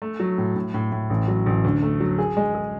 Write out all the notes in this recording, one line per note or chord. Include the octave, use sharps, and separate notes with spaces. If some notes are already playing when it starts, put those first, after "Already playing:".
A3
F#3
A2
A2
A2
A2
A1
F#3
A1
D2
A3
F#3
G#4
G#3
G#4